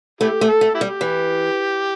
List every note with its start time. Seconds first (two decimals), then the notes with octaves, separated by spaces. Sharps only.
0.21 A3 E4 G4
0.41 A3
0.47 A4
0.61 A3
0.75 E4 G4
0.81 G3
1.01 E3